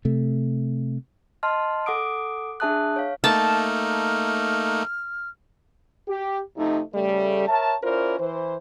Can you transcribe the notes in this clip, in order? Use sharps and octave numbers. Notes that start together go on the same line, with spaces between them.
C3 A3
D#5 A5 C6 F6
A4 F#5 D6 D#6 D7
D4 G#4 E5 A5 D#6 F#6
C#5 F5
A3 A#3 D#4 A5 F6
G4
C3 F3 A3 D#4
C#3 G3 A3
A#4 C#5 E5 A5
C#4 E4 F4 A#4 C5 D5
E3 C5